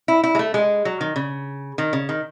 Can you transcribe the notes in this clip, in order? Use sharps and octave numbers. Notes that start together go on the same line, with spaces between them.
E4
E4
G#3
A3
G#3
F#3
D#3
C#3
D#3
C#3
D#3